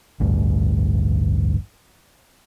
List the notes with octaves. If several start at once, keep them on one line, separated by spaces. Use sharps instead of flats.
A1 D2 G2